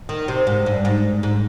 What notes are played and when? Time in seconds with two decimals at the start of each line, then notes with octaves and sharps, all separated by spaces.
0.09 D#3
0.28 C3
0.47 G#2
0.66 G2
0.85 G#2
1.23 G#2